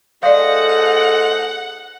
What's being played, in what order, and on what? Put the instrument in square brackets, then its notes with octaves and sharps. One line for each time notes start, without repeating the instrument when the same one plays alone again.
[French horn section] A2 G#4 A4 [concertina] C5 D#5 [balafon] D5 F5 [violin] F#5